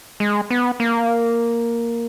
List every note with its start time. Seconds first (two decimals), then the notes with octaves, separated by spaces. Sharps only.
0.20 G#3
0.50 B3
0.80 A#3